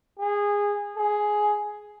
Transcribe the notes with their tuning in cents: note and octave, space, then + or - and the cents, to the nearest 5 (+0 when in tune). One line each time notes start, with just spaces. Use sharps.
G#4 -20
G#4 +10